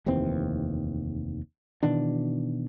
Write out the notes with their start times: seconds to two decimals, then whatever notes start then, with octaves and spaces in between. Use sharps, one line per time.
0.06 F1 D#2 E3 C4
1.83 B2 D#3 E3 D4